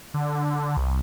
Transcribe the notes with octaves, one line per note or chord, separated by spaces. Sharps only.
D3
C2